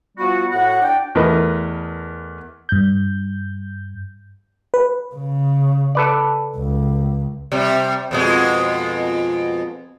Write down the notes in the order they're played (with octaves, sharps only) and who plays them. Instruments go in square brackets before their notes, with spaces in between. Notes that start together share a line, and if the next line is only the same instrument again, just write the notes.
[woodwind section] F3 G3 B3 F#4
A2 F#4 F#5
D4 D5 G5
[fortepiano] E2 A3 A#4 B4 D#5 B5
[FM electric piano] G2 G6
B4
[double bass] C#3
[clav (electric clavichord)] A4 B4 D5
[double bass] C#2
[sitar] C3 G3
F2 B2 G#3